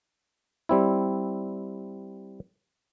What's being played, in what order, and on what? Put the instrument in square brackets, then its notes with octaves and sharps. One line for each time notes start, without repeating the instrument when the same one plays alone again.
[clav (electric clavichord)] G3 C4 E4